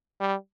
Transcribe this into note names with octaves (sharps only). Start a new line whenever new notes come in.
G3